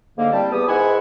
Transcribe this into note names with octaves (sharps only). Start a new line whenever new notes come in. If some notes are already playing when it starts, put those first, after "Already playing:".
G#2 D3 A#3
C2 G3 C4 A5
E2 B3 G4 D#6
G#2 D#3 E3 E4 F#5 G#5